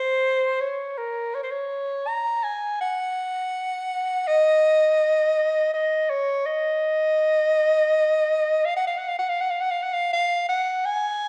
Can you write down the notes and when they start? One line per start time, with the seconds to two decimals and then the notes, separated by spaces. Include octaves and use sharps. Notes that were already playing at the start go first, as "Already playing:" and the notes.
Already playing: C5
0.61 C#5
0.98 A#4
1.35 C#5
1.43 C5
1.51 C#5
2.08 A#5
2.44 G#5
2.81 F#5
4.27 D#5
5.74 D#5
6.10 C#5
6.46 D#5
8.66 F5
8.76 F#5
8.87 F5
8.98 F#5
9.08 F5
9.19 F#5
9.29 F5
9.41 F#5
9.51 F5
9.61 F#5
9.71 F5
9.83 F#5
9.93 F5
10.13 F5
10.49 F#5
10.86 G#5